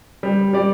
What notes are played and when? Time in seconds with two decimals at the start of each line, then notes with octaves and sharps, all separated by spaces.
0.23 G3
0.53 G3 D5